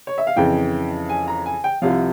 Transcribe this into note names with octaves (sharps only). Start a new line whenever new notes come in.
C#5
E5
F5
F2 C#3 E3 G5
G#5
A#5
G#5
G5
C2 C3 F3 F5